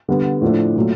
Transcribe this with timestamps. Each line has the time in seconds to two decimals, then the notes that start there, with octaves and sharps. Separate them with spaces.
0.08 D3 G3 B3
0.41 A2 F3 A3 D4
0.76 A#2 F#3 A3